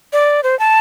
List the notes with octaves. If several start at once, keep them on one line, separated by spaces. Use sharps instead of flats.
D5
C5
A5